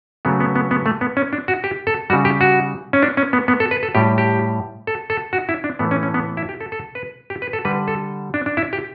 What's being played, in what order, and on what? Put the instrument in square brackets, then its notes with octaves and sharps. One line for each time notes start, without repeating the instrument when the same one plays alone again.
[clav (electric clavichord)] C#3 F#3 A3 B3
B3
B3
B3
A3
B3
C#4
D4
F#4
G4
A4
G3 F#4
C#3
G4
F#4
C#4
D4
C#4
B3
B3
A4
B4
A4
A2 G3 G4
G4
A4
A4
F#4
E4
D4
A2 E3 A3 B3
C#4
C#4
B3
E4
G4
A4
A4
B4
G4
B4
A4
D3 G3 B4
A4
D4
D4
E4
G4